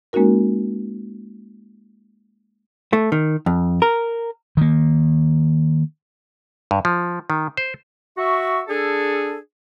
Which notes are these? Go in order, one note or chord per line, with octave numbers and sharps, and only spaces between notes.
G#3 A#3 C#4 D#4 F#4 A#4
A3
D#3
F2
A#4
D#3 A#3
G2
F3
D#3
C5
F#4 E5 C#6
D4 G#4 A4